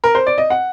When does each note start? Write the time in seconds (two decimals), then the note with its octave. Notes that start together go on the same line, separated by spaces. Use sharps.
0.04 A#4
0.15 C5
0.27 D5
0.38 D#5
0.50 F#5